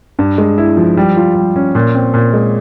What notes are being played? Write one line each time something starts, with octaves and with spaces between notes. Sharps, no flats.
G2
G#3
E4
F3
G3
F4
G3
C#4
A#2
C4
A#2
G#3